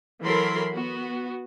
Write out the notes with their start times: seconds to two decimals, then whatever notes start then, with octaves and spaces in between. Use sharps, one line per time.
0.22 E3 F#3 A4 A#4 B5 C6
0.74 B3 F#4